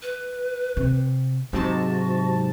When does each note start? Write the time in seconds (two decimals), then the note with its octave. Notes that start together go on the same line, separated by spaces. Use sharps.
0.02 B4
0.77 C3
1.53 G#2 C3 F#3 F#4 A5